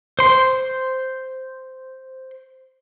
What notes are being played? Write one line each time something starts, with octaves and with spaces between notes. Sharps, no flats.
C5 C6